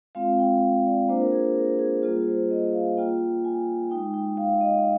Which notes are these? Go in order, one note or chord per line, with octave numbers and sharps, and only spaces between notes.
G#3 C4 F4 F5
G5
D5
A#3 D4 F4 C5
A#4
G#4
A#4
G#4
G3 A#3 F4 G#4
C5
D#5
F5
A#3 F4 G5
G#5
G#3 D#4 G5
G5
F5
D#5